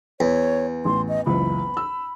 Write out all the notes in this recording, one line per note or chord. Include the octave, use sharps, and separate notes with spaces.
E2 C#5
A1 C6
D#5
F#1 C#2 E3 B5
E6